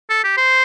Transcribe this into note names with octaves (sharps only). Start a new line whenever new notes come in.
A4
G4
C5